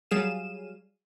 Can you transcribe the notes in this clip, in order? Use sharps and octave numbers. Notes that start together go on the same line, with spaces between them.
F#3 G3 G#4 F5 D#7 E7